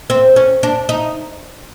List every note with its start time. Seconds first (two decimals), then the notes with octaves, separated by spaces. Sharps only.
0.10 C4
0.36 C#4
0.63 D4
0.89 D#4